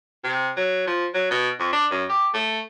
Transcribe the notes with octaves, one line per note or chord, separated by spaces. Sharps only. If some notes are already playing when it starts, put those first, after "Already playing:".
C3
F#3
F3
F#3
B2
F2
D4
F#2
G4
A3